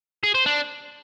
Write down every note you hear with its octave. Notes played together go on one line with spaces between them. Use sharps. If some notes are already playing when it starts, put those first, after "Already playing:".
G#4
C5
D4